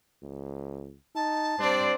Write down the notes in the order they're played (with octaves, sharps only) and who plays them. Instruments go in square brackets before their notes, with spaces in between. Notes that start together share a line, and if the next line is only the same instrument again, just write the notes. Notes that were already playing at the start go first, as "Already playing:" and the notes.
[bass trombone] C#2
[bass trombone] D#4 [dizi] A5
[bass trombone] G3 [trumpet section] C4 D4 D5 [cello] C5